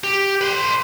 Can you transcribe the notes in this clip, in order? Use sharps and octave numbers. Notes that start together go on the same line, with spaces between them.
G4
B4 C6